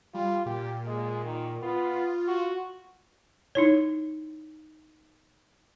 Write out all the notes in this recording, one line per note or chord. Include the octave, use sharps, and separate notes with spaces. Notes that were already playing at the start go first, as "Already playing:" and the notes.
G3 F4
A#2 G4
G#3
D#3
B3 F4
F#4
D#4 E4 C#5